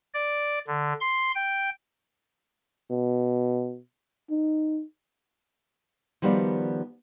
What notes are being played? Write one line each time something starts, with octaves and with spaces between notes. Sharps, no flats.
D5
D3
C6
G5
B2
D#4
D#3 F3 G3 B3 F#4 D5